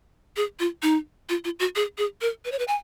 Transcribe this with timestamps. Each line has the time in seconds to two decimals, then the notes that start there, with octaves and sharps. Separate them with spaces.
0.36 G#4
0.59 F4
0.83 D#4
1.29 F4
1.44 F4
1.60 F#4
1.76 G#4
1.98 G#4
2.21 A#4
2.45 B4
2.52 C#5
2.59 B4
2.68 G#5